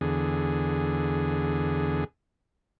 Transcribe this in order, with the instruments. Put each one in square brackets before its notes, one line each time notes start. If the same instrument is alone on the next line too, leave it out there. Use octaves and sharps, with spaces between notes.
[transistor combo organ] E2 D3 G#4